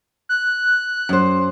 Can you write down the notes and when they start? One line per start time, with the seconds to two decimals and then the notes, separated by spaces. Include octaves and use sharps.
0.29 F#6
1.09 F#2 C5